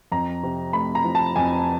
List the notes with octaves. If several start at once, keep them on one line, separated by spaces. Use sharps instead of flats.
F2 A#5
C3
A3 B5
A#5
F3
A5
F2 G#5